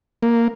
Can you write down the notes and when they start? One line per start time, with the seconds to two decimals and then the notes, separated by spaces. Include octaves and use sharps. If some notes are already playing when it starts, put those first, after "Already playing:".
0.23 A#3